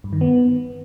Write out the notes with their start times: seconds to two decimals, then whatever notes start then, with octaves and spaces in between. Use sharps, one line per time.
0.04 G2
0.13 D#3
0.21 B3